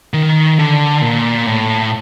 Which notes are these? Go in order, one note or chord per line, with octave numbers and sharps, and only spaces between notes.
D#3
D3
A#2
A2